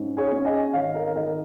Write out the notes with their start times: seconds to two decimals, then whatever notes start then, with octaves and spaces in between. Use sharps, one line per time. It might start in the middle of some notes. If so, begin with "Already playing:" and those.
Already playing: G#2 C#4
0.17 G#4 C#5
0.32 C#4
0.45 D#5 G#5
0.73 G#1 C#5 F5
0.94 A#4 D#5
1.15 D#3 A#4 D#5